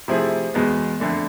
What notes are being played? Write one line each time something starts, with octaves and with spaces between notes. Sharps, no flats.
C3 F3 A3 E4 G#4
E2 B2 G#3 B3
F2 D3 A3